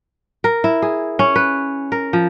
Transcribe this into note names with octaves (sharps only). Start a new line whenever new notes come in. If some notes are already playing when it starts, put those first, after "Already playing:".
A#4
E4
G#4
C#4
B4
A#4
F3